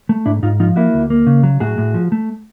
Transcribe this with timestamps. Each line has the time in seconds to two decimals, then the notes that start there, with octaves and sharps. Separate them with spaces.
0.09 A3
0.26 G#2 D4 E4
0.43 G#2 D#4 F4
0.60 F3 D#4 F4
0.76 A#3 E4 F#4
0.94 D2
1.10 A#3
1.27 C#3
1.43 F#3
1.60 A2 F#4 G#4
1.78 A2
1.94 F3
2.12 A3